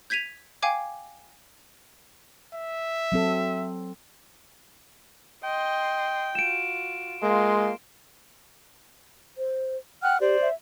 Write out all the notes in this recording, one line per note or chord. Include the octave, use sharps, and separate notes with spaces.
G6 G#6 B6 D#7 F7
F5 G5 G#5 D6 G#6
E5
F#3 C4 A4
D#5 G5 C6
F4 F#4 D7 E7
G#3 A#3 F4 C6
C5
F#5 G5 F6 F#6
G4 C5 D5
E5